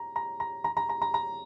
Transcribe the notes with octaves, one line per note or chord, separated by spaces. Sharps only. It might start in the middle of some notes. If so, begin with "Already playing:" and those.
Already playing: A#5
A#5
A#5
A#5
A#5
A#5
A#5
A#5